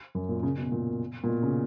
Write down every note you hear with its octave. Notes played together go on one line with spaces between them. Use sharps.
F#2
A#2
C#3
B2
A#2
A#2
B2
C#3